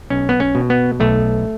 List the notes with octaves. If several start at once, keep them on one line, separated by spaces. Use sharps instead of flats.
B1 C#4
B3
C#4
B2
B3
B1 A3